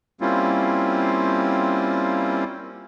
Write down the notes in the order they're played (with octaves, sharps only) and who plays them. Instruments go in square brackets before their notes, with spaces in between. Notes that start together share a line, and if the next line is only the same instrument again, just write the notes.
[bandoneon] G3 A#3 C4 C#4 E4 F4